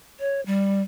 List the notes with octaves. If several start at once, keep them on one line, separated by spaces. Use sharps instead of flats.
C#5
G3